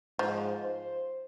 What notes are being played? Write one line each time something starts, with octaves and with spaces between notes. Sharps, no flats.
G#2 F3
C5